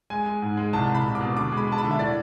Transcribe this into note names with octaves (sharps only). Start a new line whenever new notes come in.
G#3 G#5
G#3
G#2
G#3
C2 A5
C2
B5
C2
D6
B2
D3 D6
G#3 B5
G#3 A5
B5
D3
E5
A2 D5